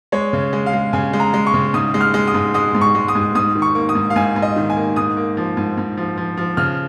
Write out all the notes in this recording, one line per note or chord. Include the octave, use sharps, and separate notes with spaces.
G#3 C#5
C#3
G#3
F5
G#3
C#3 G#5
G#3
A#5
G#3
C#6
C#3
G#2 D#6
G#3
F6
G#3
D#6
G#2
G#3 D#6
G#2
C#6
G#3
D#6
G#2
G#2 D#6
D#3
C#6
A#3
D#6
G#2
F5
G#2 G#5
G#2
D#5
D#3
G#5
A#3
G#2 D#6
A#3
F3
G#2
G#2
F3
F3
F3
C#3 F6